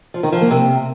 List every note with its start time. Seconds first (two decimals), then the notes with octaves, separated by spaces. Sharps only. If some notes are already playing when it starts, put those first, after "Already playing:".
0.14 F3
0.23 D#3
0.32 F3
0.42 A#3
0.51 C3